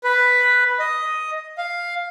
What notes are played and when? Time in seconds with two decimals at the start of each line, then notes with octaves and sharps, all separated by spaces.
0.04 B4
0.79 D#5
1.58 F5